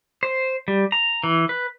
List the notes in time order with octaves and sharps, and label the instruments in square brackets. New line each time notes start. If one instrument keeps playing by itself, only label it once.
[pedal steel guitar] C5
G3
A#5
E3
B4